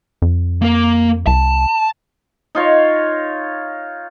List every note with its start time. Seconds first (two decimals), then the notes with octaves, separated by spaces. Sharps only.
0.22 F2
0.62 A#3 A#4
1.27 C2 A5
2.55 D#4 F4 C#5